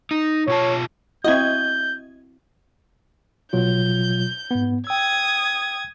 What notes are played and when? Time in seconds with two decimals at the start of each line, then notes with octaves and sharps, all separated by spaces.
0.11 D#4
0.48 B2 F4 C#5 A5
1.24 C4 E4 F#4 D#5 G6 G#6
3.53 B2 F#3 F4 G6
4.51 G#2 B3
4.87 G5 D#6 E6 G#6